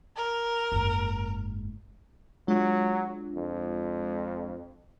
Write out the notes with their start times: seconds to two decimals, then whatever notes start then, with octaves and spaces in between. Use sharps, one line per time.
0.16 A#4
0.72 F#1 G#2
2.48 F#3 G#3 D4 F4
3.35 F2